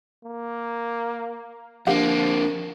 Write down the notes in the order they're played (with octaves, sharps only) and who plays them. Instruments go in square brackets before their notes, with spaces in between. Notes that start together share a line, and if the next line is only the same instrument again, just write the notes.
[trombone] A#3
[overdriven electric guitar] F2 A#3 [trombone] F3 [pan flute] D4 [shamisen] G4 F5 F#5